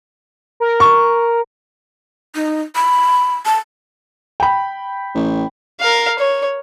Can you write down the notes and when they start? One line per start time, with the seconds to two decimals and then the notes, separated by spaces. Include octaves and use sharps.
0.60 A#4
0.80 C#6
2.35 D#4
2.76 B5
3.46 A5
4.40 G5 B5
5.15 A1
5.81 A#4 F5
6.19 C#5